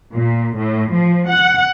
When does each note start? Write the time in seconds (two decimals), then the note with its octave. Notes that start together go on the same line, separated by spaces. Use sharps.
0.15 A#2
0.57 A2
0.92 F3
1.28 F#5